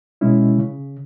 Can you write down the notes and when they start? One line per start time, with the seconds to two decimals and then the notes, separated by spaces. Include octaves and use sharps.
0.21 B2 G#3 C#4 E4
0.58 C#3